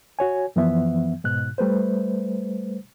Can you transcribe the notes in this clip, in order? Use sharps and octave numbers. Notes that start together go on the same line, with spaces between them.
F#4 C#5 G#5
F#2 E3 F3 B3 E5
G#2 B2 F#6
G3 A3 B4 C5